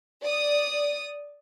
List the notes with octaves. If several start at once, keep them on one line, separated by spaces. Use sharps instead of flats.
D5 D#6